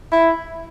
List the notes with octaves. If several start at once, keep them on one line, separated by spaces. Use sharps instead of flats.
E4